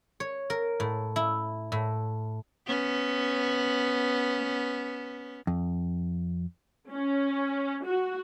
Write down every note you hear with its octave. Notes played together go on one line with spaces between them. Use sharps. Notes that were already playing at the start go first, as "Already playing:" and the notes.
C#5
A#4
A2
E4
A2
B3 C#4
F2
C#4
F#4